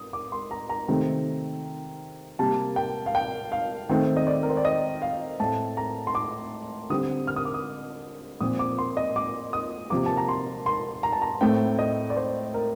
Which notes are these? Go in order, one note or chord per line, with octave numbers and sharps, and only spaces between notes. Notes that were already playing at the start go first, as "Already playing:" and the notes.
Already playing: D#6
D6
C6
A#5
A#5
C3 D#3 A3 C4
C3 G3 A#3 A5
G5
F5
G5
F5
D#3 A3 C4
D#5
D5
A#4
C5
D5
D#5
F5
A2 A3 C4 A5
A#5
C6
D6
D3 G3 C4 D#6
F6
D#6
D6
D#6
A#2 F3 C4 D#6
D6
C6
D#5
D6
D#6
C3 F3 A#3 D6
A5
A#5
C6
C6
A#5
A5
A#5
A2 A3 C4 G5
D#5
D5
C5
A#4